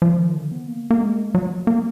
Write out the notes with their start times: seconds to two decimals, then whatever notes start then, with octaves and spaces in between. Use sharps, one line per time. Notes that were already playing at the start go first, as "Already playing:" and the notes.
0.02 F3
0.19 D#3
0.35 D3
0.52 B3
0.68 A#3
0.90 A#3
1.01 G#3
1.35 F#3
1.67 A#3